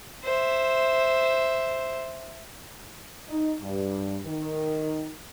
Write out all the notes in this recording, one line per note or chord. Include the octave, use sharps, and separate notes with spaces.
C5 E5
D#4
G2
D#3